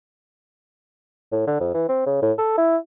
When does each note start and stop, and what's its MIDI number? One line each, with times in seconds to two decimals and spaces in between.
1.32 1.46 45
1.47 1.60 50
1.60 1.73 41
1.74 1.86 52
1.89 2.06 60
2.06 2.20 49
2.22 2.32 45
2.38 2.58 69
2.58 2.77 64